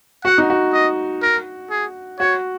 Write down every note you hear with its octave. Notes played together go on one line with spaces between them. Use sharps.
F#4 F#5
D#4
F#4
D#5
A#4
G#4
F#4 C#5